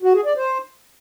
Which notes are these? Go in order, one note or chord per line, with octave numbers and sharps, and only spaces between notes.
F#4
G#4
D5
C5